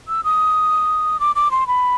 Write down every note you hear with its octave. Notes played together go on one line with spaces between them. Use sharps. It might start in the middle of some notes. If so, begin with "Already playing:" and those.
E6
D#6
D6
D6
C6
B5